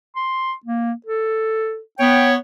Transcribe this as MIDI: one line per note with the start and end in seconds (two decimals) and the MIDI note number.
0.16 0.53 84
0.65 0.92 58
1.06 1.79 69
1.99 2.35 59
1.99 2.35 73
1.99 2.27 79